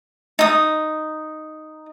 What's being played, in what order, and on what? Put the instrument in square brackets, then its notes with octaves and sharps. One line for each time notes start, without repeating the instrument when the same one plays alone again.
[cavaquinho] D#4 D#6